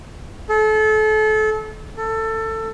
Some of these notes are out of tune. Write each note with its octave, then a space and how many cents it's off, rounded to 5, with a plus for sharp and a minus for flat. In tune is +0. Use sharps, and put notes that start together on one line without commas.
A4 -30
A4 +20